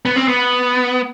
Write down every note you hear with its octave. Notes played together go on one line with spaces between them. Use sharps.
B3
C4
B3